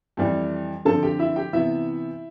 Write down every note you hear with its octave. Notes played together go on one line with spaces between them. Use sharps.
F2 E3 G3
D3 F3 C4 A4 A5
G4 G5
E4 E5
G4 G5
C3 E3 B3 E4 E5